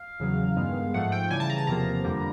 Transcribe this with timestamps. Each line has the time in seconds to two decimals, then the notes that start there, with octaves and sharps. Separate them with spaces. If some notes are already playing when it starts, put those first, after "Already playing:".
Already playing: F5
0.20 E2 C#3 F#3
0.56 G2 D#3 G#3 B3
0.94 G#2 F3 A3 F#5
1.12 G5
1.31 C#3 E3 G3 G#5
1.40 A5
1.50 A#5
1.58 A5
1.67 E2 C3 F3 A#3 A#5
2.04 F2 D3 G3 A#3